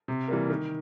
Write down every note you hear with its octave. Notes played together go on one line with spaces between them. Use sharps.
C3
E3 G3 A#3
D#3